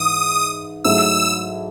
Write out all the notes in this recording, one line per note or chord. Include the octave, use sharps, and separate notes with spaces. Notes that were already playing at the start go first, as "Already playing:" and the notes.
Already playing: G#2 E3 D#6
G#2 F#3 A3 E4 E6